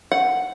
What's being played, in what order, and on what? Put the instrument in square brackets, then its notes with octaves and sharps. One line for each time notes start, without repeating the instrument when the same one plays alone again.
[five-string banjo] F#5